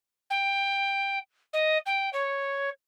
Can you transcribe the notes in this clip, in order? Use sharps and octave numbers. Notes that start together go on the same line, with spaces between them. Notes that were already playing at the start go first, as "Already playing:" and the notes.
G5
D#5
G5
C#5